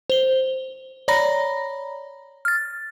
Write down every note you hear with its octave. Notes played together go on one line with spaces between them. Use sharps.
C5 G7
C#5 D5 A#5 B5 A#6
F6 A6